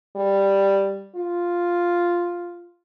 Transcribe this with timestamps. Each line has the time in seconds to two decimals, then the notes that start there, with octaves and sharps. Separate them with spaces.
0.16 G3
1.16 F4